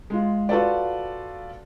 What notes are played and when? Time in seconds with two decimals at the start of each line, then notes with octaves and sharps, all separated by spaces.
0.10 G#3 F4
0.49 F4 F#4 A4 B4 D5